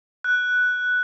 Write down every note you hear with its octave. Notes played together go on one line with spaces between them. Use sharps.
F#6